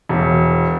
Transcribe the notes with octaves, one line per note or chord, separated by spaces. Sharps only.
E1